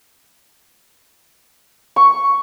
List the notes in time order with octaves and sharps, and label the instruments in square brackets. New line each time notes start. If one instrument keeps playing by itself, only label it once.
[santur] C#6